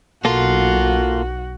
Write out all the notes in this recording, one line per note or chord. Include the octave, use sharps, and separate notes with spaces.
B1 A#3 F4 F#4 A4